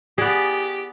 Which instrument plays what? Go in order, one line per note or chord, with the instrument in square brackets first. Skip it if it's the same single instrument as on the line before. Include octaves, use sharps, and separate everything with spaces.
[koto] B3 D5 [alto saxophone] G4 [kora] G#4